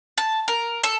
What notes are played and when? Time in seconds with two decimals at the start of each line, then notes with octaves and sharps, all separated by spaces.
0.18 A5
0.48 A#4
0.84 A4